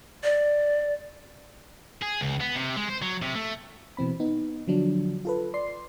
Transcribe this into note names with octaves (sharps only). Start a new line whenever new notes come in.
D5
G#4
C#2
B3
C3
G#3
C5
F#3
C3
A3
B2 E3 C4 B5
B3 D#4
D3 F3 F#3 D4
F4 A4 B4
D5 C6 C7